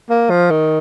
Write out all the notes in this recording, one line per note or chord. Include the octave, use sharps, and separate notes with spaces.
A#3
F3
D#3